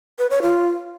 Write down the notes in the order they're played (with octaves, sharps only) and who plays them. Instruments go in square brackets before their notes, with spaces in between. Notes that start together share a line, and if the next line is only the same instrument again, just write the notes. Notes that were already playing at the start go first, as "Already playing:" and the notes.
[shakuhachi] B4
C#5
F4